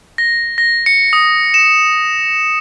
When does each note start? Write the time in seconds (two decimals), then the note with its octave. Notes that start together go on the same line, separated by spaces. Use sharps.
0.18 A#6
0.58 A#6
0.86 C#7
1.13 D#6
1.54 E7